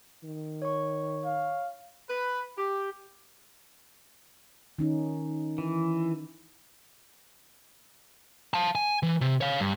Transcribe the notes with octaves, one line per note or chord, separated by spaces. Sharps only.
D#3
C#5 C#6
F5
B4
G4
D#3 C#4 D#4
E3
F5 A5
G#5
E3
C3
C#5 F5
G2